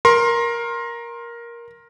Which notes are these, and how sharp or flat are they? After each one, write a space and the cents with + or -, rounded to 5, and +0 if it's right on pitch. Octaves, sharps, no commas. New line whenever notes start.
A#4 +10 C6 +25